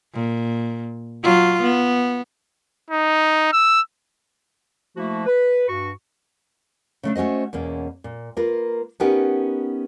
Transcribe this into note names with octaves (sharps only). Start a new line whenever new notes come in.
A#2
F#3 F4
B3
D#4
E6
F3 A3 A#3 E4 F#4
B4
G2 F#4 C#6
C#3 A3 D4
A3 C#4 F#4 C5 D#5
E2 B2 A#3 C#4
A#2
A#3 F4 A#4 B4
B3 C#4 D#4 G4 A#4 B4